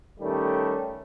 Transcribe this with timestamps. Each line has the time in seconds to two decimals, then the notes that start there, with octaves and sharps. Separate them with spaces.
0.19 D#3 G3 A3 C#4 G4